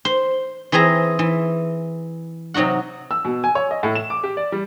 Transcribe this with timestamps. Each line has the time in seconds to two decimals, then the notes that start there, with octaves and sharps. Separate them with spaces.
0.05 C5
0.72 E3 C4 G#4 E5 A#5
1.19 E3
2.54 C3 F#3 D#4 F#4 F#5
3.11 E6
3.25 B2
3.44 G#5
3.55 C#5
3.71 D#5
3.83 A2
3.95 E7
4.10 D6
4.24 G4
4.37 D5
4.52 G3